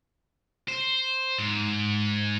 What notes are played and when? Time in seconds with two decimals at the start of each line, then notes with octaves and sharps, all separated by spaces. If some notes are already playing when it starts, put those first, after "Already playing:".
0.68 C5
1.39 G#2